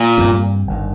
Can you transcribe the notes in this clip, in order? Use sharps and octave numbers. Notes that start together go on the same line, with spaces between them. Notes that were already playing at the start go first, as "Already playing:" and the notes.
Already playing: A#2
G2 G3 C4
G1 G2 D#3